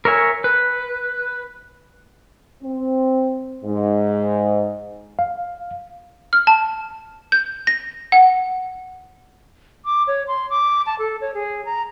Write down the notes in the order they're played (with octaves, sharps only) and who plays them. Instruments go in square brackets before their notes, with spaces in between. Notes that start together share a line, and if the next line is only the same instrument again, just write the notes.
[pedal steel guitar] A#4 C#5 E5 G#5
B4
[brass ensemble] C4
G#2
[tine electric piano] F5
[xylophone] F6
A5
G6
A#6
F#5
[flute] D6
C#5
C6
D6
A5
A4
C#5
G#4
A#5